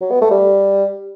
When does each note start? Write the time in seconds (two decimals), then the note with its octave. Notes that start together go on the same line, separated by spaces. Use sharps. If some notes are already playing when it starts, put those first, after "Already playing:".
0.01 F#3
0.11 B3
0.21 A3
0.31 G3